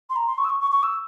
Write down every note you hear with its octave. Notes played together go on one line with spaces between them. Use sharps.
C6
A#5
C6
C#6
E6
C#6
C#6
C#6
E6